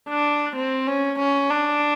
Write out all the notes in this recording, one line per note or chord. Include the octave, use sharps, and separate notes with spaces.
D4
C4
C#4
C#4
D4